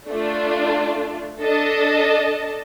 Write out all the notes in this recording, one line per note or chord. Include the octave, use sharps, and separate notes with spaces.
A3 D4 F4
D4 A4 D#5 A5